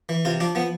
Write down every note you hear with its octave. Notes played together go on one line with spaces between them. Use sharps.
E3
C3 F4
F3 D4
F3 B3